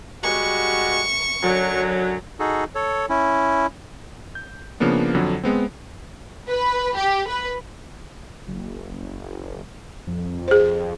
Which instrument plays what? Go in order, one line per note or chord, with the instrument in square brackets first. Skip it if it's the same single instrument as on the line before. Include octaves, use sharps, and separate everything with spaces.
[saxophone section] G3 G#3 F#4 [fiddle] C#6
[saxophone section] F#2 D3 F#3
[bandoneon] D#4 F#4 G#4 A4
A4 C#5
C#4 E4
[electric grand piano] G6
C#3 F3 A#3 B3 D4
F2 D3 F#3
G#3 B3 C4
[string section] B4
G4
B4
[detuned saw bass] F#1
F2
[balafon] G#4 C5